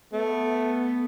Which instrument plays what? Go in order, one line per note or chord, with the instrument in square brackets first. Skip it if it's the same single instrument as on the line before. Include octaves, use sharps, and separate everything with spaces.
[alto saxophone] A3 [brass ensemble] B3